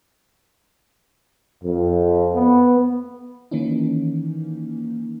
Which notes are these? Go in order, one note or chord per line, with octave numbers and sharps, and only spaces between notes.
F2
B3
D#3 E3 A#3 C#4 D#4